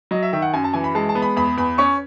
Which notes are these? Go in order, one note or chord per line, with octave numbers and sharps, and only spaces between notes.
F#3 D#5
E5
D#3 E5
F#5
F#2 G#5
A5
E3 G#5
B5
G#3 A5
A5
B3
B5
E2 B5
E2 B5
C#4 C#6